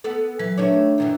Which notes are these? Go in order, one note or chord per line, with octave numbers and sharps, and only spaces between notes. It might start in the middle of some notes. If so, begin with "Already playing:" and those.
B3 A4
E3 F#3 B4
D#3 A3 D4 C#5 E5
F#2 D#3 E3